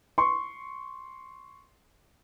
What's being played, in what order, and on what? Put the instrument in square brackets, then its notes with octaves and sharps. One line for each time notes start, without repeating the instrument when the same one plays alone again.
[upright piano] C6 C#6